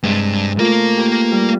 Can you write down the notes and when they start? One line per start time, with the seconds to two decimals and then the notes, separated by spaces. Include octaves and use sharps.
0.03 G2 C3 G#3
0.59 A3 A#3 F4 A#4
0.97 G4 B4
1.32 G3